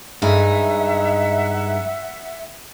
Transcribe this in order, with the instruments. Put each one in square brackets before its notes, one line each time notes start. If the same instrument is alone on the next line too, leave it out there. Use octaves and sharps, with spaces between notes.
[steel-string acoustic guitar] G2 G#3 D#4 [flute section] E5 F#5